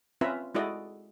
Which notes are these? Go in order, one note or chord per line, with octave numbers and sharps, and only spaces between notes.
C4 C#4 F4 B4 E5 A#5
G#3 E4 F#4 A4 D5 D#5